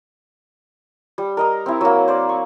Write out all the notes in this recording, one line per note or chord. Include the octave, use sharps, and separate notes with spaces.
G3
A#4 D#5 A#5
C4 E4
F#3 A#3
C5 D5
C#6